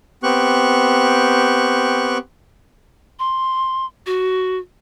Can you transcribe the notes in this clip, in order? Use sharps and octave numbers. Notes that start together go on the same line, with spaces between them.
B3 C4 G4 C#6 F#6
C6
F#4